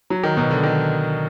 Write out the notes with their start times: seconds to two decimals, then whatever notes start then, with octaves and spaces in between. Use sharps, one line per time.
0.10 F#3
0.24 D#3
0.37 B2
0.51 D3
0.64 D#3